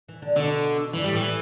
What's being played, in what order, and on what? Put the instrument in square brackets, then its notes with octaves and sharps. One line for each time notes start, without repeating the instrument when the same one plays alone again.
[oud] E3
D3
[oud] B2 [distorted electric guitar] D3
[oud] G2 [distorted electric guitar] E3
[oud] A2 [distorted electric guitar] G3
[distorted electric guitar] E3
[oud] A2